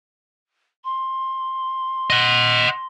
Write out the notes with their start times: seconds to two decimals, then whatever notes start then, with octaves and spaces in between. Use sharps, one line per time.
0.84 C6
2.10 D#5 F#5